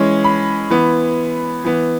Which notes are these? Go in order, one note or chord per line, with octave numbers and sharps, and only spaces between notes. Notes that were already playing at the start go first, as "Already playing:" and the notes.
Already playing: E3 G#3 C#4
B5
E3 B3
E3 B3